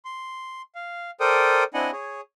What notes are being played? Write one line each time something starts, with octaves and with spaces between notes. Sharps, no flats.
C6
F5
A4 A#4 C5 D5 G5 D#6
C4 D4 E4 D#5 F#5 G#5
G#4 C#5